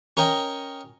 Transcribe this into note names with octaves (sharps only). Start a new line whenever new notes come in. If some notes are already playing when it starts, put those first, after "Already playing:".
C#4 A#4 D#5 G5